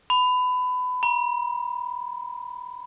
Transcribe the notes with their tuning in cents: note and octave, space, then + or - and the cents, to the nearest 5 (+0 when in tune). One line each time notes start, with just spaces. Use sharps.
B5 +25
B5 -45